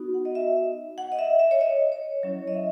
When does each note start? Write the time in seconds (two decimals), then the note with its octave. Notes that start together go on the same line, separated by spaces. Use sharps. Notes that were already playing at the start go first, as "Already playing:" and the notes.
Already playing: B3 D#4 F#4
0.14 F#5
0.25 D#5
0.35 E5
0.98 F#5
1.12 D#5
1.19 E5
1.39 E5
1.51 C#5
1.61 D#5
1.92 C#5
2.23 F#3 C#4 E4 C#5
2.48 D#5
2.54 E5